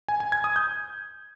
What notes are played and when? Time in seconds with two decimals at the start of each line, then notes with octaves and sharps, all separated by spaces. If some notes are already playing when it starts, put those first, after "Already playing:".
0.08 G#5
0.20 G#5
0.32 G#6
0.44 D#6
0.56 G6